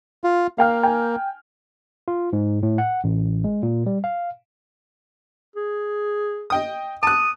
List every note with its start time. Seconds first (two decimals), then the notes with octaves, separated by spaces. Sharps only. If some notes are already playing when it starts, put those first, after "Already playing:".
0.24 F4
0.58 A#3 F5 G5 F6
0.83 G5 G#5
2.08 F4
2.33 G#2
2.63 A2
2.78 F#5
3.04 A1
3.44 G#3
3.63 A#2
3.86 G3
4.04 F5
5.56 G#4
6.50 D#5 G5 D#6
7.03 A5 D#6 F#6